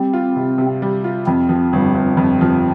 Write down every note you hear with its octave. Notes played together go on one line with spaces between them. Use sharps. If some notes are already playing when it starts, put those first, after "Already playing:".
Already playing: G3 C4
F4
C3
C3
G3
F4
F2 C4
F3
G1
G1
F2
F3